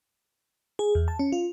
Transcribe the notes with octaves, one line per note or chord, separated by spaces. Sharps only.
G#4
E2
A5
C#4
F4